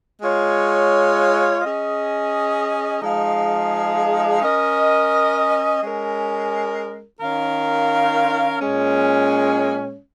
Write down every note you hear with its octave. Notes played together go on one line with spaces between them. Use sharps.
G#3 F4 C#5
C#4 G#4 D#5
F3 G#3 D#4 G#4 F5
C#4 A#4 D#5
G#3 C#4 A#4
D#3 C#4 A#4 F5
A#2 G#3 C#4